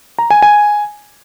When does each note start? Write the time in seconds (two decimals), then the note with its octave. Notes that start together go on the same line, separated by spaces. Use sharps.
0.19 A#5
0.30 G#5
0.42 G#5